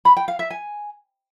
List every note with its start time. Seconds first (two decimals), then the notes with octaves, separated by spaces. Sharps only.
0.05 B5
0.17 G5
0.28 F5
0.39 E5
0.50 G#5